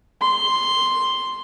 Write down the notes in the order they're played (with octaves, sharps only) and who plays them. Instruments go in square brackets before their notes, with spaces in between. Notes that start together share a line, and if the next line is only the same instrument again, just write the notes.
[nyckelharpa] C6